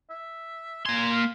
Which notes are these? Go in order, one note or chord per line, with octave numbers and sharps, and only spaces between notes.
E5
A#3 G#5 C6
F5